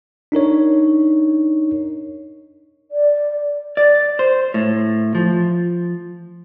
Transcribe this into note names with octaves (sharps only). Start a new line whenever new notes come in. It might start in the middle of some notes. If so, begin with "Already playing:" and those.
D4 D#4 A#4 C#5
D5
D5
C5
A2
F3